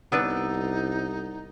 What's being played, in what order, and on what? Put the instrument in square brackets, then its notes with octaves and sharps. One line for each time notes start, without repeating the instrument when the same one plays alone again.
[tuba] C2 [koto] B3 D4 B4 [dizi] D#4 [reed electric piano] F#5 E6 A6